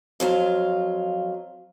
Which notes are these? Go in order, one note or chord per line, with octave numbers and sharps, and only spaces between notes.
F2 F#3 F4